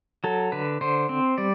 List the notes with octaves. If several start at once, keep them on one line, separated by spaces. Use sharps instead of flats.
F#3 A4
D3 B4
D3 C5
C4
G3 D5